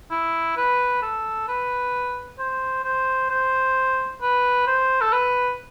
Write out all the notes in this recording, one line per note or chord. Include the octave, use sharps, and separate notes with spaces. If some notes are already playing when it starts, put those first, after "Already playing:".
E4
B4
A4
B4
C5
C5
C5
B4
C5
A4
B4